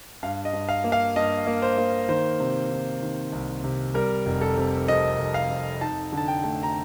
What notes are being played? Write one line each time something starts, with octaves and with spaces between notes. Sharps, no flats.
G2 F5
D#5
G2
F5
A#3
F5
G2 D#5
A#3
C5
A#3
D#3 C5
C3
D#3
D#3
C2
C3
G3 A#4
F1
A4
C3
F2 D#5
F1
F5
F2
D#4 A5
D3
A5
G5
A3
A#5